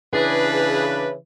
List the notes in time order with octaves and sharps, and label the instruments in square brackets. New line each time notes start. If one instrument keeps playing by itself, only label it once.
[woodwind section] C#3 E3 [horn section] D4 B4 [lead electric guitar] G#4